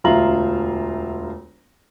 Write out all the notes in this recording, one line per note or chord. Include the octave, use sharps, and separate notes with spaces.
E1 D2 F4 E5 A#5 F#7